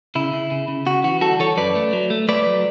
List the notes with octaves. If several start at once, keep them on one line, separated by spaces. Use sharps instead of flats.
C#3 E4
C#3
C#3
C#3
C#3 F#4
E3 F#4
G3 F#4 A4
E3 A4 C#5
F#2 B4 D5
A3
F#3
A3
A3 B4 D5
F#3